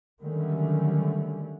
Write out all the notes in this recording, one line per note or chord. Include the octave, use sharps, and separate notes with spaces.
D3 D#3 F#3 G3 A3 C#4